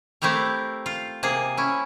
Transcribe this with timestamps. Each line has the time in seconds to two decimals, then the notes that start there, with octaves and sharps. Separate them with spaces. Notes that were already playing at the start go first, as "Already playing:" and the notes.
0.22 A3 C4 E4 G4 A#4
0.86 F4
1.23 C3 A#3 G#4
1.57 C#4 E4